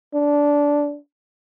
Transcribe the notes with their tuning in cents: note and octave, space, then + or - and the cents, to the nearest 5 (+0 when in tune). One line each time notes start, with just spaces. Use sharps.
D4 -10